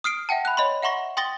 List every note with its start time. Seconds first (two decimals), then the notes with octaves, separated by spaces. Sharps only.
0.04 D#6 F6 C7 D7
0.29 E5 F#5 G5 A5
0.45 B5 F#6
0.57 C#5 D#5 B5 C6
0.83 E5 F#5 A#5 C6 C#6 A#6
1.17 G5 C6 D#6 A6 A#6 G7